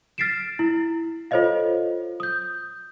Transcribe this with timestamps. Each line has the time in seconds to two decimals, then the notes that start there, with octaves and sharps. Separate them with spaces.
0.18 F6 A6 B6 C7 D7 E7
0.59 E4
1.31 F4 A4 C5 C#5 D#5 F5
2.20 D#6 G6